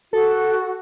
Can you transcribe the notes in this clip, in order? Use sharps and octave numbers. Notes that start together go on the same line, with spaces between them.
F#4 A4